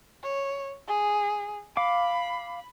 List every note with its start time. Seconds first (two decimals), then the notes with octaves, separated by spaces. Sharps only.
0.23 C#5
0.88 G#4
1.77 F5 B5 D6